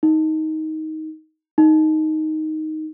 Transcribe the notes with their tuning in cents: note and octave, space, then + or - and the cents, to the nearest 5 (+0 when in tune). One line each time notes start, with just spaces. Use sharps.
D#4 +15
D#4 +5